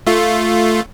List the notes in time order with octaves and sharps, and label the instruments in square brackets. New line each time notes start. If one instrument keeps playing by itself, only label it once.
[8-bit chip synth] A3 F4